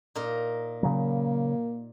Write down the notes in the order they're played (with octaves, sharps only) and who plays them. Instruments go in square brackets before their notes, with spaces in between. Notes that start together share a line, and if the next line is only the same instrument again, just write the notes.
[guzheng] A#2 D#4 A#4
[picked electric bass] C#3 F#3 [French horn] A#3